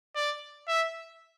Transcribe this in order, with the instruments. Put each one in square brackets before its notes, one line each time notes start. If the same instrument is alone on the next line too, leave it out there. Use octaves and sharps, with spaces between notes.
[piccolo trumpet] D5
E5